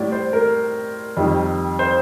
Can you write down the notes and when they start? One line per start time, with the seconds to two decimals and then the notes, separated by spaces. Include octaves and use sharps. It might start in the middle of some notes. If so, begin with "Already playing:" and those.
Already playing: A2 G3 D5
0.12 C5
0.33 A#4
1.17 F2 D#3 G3
1.79 C5